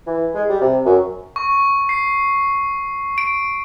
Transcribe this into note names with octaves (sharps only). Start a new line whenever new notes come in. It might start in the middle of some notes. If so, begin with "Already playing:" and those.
E3
G#3
G3
C3
F#2
C#6
C7
D7